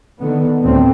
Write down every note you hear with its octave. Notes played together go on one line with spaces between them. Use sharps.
D3 D#3 B3
D2 A2 C4